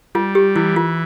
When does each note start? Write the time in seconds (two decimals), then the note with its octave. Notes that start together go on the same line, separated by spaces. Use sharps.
0.15 G3 F4
0.35 G4
0.56 E3 E4
0.76 F4